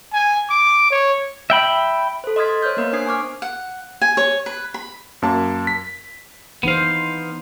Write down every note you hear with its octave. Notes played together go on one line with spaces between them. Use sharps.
G#5
D6
C#5
E5 G5 B5
A4 C5
D#5 C6 D#6 F6 G#6 B6
C5 C#5 F6 G6
A#3 B3 A#4
D4 C5 D#6 G#6 C7
G#5 C#6 D6 F6
F#5
G#5
C#5
B4
B5
F#2 A#3 A5
B6
E3 B3 D#4 C5 F5